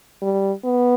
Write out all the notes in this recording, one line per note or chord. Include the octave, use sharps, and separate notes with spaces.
G3
B3